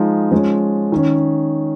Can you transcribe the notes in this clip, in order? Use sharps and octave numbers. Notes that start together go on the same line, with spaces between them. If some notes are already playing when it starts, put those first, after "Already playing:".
Already playing: F3 G#3 D#4
F3 G#3 C#4
D#3 C#4